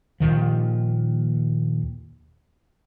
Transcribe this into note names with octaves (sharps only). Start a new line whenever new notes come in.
D#2 A#2 D#3 F3